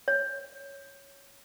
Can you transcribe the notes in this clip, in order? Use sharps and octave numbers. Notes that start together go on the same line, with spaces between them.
C#5